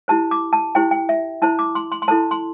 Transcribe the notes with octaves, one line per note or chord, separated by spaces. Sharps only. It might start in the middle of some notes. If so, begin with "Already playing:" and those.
E4 G4 C5 A5
D6
A5
E4 G4 C5 G5
G5
E5
E4 C5 A5
D6
C6
C6
C6
E4 A4 C5 A5
C6